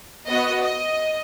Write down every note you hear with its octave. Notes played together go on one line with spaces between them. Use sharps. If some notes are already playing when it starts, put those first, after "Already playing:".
B3 F#4 D#5
D#5